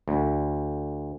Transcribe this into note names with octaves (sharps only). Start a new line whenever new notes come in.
D2